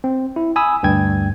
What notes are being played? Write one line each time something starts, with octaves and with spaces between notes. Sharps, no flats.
C4
E4
G#5 B5 D#6 E6
D2 G2 G5 G#6